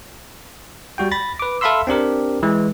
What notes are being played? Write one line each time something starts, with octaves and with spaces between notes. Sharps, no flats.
G3 F#4 G5
B5 A6 A#6
B4 D6
A4 E5 F5 B5 C6 E6
C4 D4 G4 A#4
E3 G#3